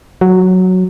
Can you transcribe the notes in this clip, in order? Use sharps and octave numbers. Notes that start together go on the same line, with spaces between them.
F#3